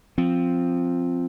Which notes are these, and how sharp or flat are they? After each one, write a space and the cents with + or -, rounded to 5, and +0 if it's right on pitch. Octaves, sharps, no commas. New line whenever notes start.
F3 +0 C4 +0